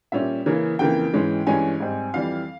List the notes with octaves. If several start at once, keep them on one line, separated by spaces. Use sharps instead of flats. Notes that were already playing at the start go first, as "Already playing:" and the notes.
A#2 G3 C#4 E5
C#3 E3 A#3 C#4
F2 C#3 E3 A#3 G5
G#2 E3 G#3 C#4
G2 E3 G#3 C#4 G#5
G#2 G3 C4
F2 E3 G3 F5